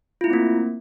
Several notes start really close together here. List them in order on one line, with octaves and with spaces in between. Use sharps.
F4 E4 A3 C4 A#3